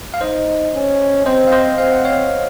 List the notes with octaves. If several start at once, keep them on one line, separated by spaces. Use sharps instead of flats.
F5
D#4 C5 D#5
C#4
C4 C5 D#5
F5
C5 D#5
C4 F5
F#5
C#5 F5